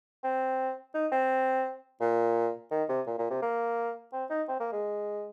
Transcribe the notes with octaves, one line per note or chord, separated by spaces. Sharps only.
C4
D#4
C4
A#2
D#3
C3
A#2
A#2
C3
A#3
C4
D#4
C4
A#3
G#3